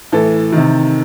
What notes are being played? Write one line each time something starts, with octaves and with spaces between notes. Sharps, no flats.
A2 E3 A4
C3 D#3